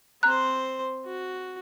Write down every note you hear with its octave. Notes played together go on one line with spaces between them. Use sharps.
C4 C5 A#5 F#6
F#4